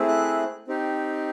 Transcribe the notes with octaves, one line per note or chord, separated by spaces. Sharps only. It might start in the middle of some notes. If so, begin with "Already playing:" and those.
Already playing: A3 C4 E4 G#4
F#6
C4 D#4 G4